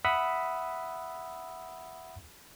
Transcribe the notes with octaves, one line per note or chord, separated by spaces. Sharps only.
E5 F#5 B5 D#6 E6